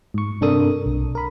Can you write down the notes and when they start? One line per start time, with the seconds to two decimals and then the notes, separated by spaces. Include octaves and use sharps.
0.14 G#2 C#6
0.41 G2 C3 D4 A4 A#4 D#6
0.86 B1
1.15 A#4 B5